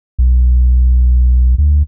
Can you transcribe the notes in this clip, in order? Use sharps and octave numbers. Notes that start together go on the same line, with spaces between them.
B1
D2